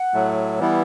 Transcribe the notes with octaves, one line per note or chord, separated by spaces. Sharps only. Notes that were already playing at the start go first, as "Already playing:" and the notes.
Already playing: F#5
A2 F#3 A3
E3 G3 B3 E4